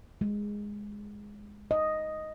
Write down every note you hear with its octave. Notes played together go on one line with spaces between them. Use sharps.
G#3
D#5